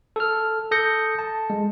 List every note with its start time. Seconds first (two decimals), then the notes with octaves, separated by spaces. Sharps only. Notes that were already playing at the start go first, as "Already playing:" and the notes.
0.16 A4 F6
0.71 A4 D#6 G6 A#6 C#7
1.19 A5
1.50 G#3